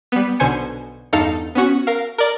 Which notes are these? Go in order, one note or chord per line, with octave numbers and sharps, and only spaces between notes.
G3 B3
B1 B2 D3 C5 G#5 C#7
E2 G2 D#4 A4 F5 C#7
B3 C#4 F#4
A#4 F5
A#4 D5